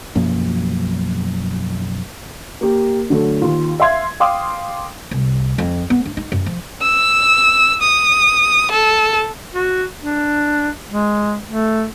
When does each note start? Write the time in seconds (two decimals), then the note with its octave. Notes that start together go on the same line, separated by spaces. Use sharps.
0.15 B1 F#2 F3 A#3
2.61 A#3 G4
3.10 D3 F#3 A3
3.42 D#2 F4
3.80 E5 F5 C6 G#6
4.20 F5 G5 C6 D6 D#6
5.11 C2
5.58 F2
5.90 B3
6.06 D4
6.17 D#4
6.32 F#2
6.46 F3
6.82 E6
7.81 D#6
8.71 A4
9.54 F#4
10.02 D4
10.90 G#3
11.47 A3